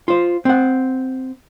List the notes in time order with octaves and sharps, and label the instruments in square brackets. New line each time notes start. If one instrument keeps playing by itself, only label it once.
[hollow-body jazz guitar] F4 C5
C4 F#5